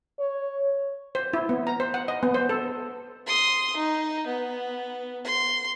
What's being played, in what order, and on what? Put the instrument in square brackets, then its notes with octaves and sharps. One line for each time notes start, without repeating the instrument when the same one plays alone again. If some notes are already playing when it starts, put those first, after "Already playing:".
[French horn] C#5
[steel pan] C5
E4
B3
A#5
C5
F#5
D#5
B3
C5
A4
[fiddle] C6 D#6
D#4
B3
C6